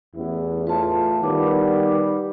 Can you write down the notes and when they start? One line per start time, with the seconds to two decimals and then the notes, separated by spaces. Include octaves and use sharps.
0.15 A1 E2 B3 E4
0.67 A2 F4 B4 A5
1.23 D#3 G3 B3 D6